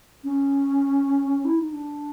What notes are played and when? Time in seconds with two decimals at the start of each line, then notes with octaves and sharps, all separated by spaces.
0.24 C#4
1.45 E4
1.58 D#4
1.73 D4